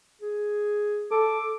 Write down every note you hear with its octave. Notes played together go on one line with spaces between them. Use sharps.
G#4
A4 D6